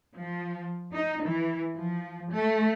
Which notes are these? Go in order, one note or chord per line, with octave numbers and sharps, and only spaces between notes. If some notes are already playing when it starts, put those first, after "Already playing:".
F3
D#4
E3
F3
A3